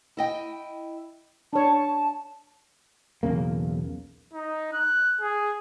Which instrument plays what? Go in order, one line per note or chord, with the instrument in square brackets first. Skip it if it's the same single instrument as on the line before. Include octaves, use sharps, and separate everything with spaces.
[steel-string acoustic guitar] E4 D#5 G5
[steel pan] D4 C#5 [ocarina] A5
[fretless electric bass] B1 E2 C#3 A#3
[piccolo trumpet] D#4
F#6
G#4